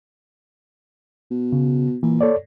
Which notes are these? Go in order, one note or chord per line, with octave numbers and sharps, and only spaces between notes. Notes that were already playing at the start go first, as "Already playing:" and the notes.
B2
C#3
A#2 E3
A4 C#5 D5